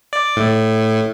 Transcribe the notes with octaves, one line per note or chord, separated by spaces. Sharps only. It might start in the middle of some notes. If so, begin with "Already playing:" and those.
D5
A2